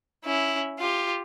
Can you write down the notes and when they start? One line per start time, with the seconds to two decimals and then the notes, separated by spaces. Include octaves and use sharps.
0.25 C#4 E4
0.79 F4 G4